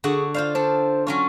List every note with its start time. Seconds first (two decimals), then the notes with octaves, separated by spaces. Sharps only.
0.04 D3 F#4 G#4 F#5
0.34 F4 C5 D5 F5
0.55 D4 A4 C5
1.07 F#3 C#4 F4 C#6